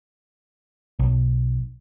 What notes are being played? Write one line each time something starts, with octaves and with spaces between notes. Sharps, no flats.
B1